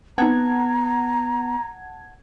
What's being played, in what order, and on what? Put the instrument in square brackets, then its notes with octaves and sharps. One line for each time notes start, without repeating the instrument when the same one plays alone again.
[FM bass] B3 [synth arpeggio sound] C4 D#4 [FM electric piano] F#5 A5 G#6 [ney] A#5